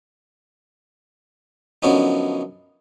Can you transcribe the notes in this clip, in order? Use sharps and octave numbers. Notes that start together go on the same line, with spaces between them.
F#2 D3 F3 B3 C#4 D#4